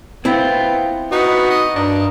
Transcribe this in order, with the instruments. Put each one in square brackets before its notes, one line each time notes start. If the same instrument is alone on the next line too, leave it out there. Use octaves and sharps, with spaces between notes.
[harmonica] B3 F4 G5 [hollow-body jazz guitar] C4 E4
[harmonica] B3 [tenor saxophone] D#4 [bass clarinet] F#4
[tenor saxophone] D#5
[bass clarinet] G2 [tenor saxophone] D4 [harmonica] A#4